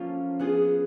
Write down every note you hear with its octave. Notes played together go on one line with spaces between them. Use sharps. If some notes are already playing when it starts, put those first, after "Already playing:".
Already playing: F3 A#3 C#4 F4 A4
B3 D4 F4 G#4